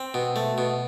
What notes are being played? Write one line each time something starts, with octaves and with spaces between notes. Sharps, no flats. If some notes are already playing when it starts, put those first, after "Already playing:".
Already playing: C4
B2
A3
B2